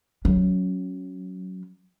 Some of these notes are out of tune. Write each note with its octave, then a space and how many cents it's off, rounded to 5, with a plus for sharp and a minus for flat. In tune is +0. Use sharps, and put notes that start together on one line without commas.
F#3 +0 C#4 +0